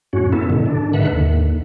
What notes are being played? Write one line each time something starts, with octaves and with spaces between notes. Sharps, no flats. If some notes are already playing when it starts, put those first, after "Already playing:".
F#2 A2 C#4 F#4
B3 E4 A4
G#2 B2 D3 D#3
D4
G#2 D3 D#3 B4 E5 F#5
D#2